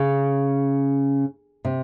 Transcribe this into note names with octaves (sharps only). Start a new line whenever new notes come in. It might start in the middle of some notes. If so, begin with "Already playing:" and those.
Already playing: C#3
C3